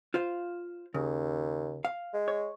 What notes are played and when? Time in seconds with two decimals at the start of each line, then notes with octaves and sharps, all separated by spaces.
0.14 F4 C5 F5
0.94 D#2 C#3
1.85 F5
2.13 G#3
2.28 C#5